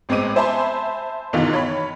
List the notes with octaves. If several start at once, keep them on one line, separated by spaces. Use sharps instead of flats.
A1 G#3 B3 C4 D6 D#7
C5 E5 G#5 A5 B5 C6
F#1 B2 D#3 E3 D#4 F4
C#5 B5